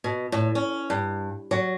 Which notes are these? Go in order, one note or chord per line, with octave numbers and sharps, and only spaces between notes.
B2
A2
C#4
G2
F#3